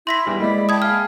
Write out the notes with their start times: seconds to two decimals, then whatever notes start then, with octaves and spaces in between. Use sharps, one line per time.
0.07 E4 C6 A#6 B6
0.27 E2 E3 G3 G5
0.40 G#3 A#3 E4 D5 D#5 B5
0.69 G5 A5 B5 D#6 G#6
0.82 G#4 F5 D#6 F6